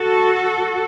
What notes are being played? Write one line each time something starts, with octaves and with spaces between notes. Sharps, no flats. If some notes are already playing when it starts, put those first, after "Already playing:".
Already playing: F#4 A4